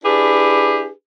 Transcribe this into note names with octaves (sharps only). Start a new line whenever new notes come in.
D4 E4 G4 G#4 B4